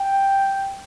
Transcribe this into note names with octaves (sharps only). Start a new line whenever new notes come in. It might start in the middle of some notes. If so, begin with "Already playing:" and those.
Already playing: G5